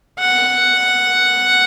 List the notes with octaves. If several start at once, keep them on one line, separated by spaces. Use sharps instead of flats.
F#5